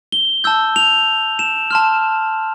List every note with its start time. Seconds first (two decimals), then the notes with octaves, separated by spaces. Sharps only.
0.12 G7
0.44 A5 E6 G6
0.76 F7
1.39 E7
1.71 A5 C6 F6